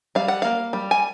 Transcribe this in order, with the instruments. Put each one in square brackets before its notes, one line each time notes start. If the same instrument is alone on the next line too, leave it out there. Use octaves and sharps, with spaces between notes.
[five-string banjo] G3 F5
F#5
A#3 F5
G3
G#5